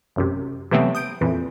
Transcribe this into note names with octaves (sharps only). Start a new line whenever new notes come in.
A1 F#2 C3
C3 E3 F#3 A3 B3 C4
D#6 G6 D7
F2 A#2 E3